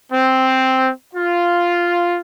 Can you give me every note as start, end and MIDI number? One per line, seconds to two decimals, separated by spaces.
0.12 0.91 60
1.16 2.18 65